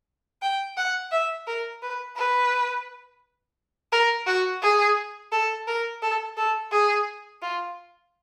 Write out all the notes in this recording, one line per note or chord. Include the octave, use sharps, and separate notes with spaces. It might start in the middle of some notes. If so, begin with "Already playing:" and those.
G5
F#5
E5
A#4
B4
B4
A#4
F#4
G#4
A4
A#4
A4
A4
G#4
F4